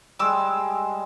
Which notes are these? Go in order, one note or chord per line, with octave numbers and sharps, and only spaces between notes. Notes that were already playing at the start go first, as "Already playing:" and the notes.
G3 G#3 D6 E6